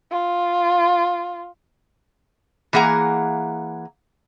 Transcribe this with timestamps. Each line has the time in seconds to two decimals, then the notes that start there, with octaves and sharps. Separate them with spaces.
0.11 F4
2.73 E3 A#3 G#4 F#5 A#5